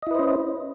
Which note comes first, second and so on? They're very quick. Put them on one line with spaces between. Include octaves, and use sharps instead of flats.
D#5 E4 B4 C5 C#4